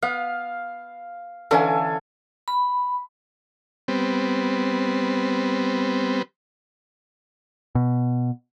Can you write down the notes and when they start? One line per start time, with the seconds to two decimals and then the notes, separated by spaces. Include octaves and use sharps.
0.02 B3 F5
1.51 D3 E3 C#4 A4 F5 G#5
2.48 B5
3.88 G3 B3 C4
7.75 B2